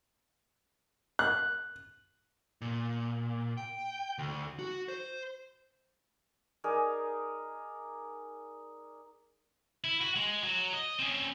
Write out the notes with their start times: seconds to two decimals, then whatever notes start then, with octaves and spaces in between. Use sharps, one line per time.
1.19 F#6
2.61 A#2
3.58 G5
4.18 D2
4.59 F#4
4.88 C5
6.64 D#4 G#4 A#4 D5
9.84 E4
10.01 F#4
10.16 G#3
10.43 F#3
10.74 D#5
10.99 C4 C#4